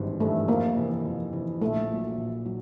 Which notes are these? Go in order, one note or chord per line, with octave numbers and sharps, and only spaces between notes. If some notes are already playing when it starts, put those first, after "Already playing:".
Already playing: G#1 G2 E3 G#3
G2 E3 G#3 A3
F2 A#3
C3 E3
F2
C3 E3
A#1 A3
A#2 F#3
A#1
F#3